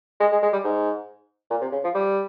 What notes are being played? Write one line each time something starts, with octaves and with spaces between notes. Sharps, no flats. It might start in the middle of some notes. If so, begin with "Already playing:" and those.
G#3
G#3
G#3
G3
G#2
A#2
C3
C#3
F3
G3